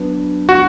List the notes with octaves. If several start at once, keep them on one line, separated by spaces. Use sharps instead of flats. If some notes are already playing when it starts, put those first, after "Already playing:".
Already playing: F#3 B3 D4
F#4